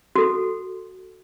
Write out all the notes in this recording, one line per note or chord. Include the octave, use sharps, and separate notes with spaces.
F#4 A4